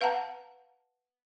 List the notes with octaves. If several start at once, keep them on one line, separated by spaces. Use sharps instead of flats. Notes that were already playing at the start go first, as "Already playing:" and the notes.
B4 F5 F#5 A5 A#5